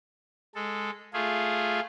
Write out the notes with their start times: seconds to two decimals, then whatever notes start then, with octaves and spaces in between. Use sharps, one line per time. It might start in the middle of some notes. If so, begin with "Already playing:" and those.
0.55 G#3 A4
1.14 A3 F4 G#4